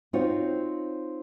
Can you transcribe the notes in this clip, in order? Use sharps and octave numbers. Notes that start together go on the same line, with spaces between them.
C4 D#4 F4 F#4 C5 C#5